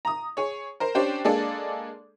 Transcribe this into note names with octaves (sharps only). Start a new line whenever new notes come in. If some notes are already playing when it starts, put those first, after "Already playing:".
A#5 D#6
G#4 C#5
A#4 C5
C#4 D4 G4 C5
G#3 A#3 D4 G#4 A4 D5